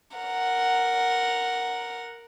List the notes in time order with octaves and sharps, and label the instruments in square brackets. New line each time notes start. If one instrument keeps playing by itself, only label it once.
[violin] A#4 F#5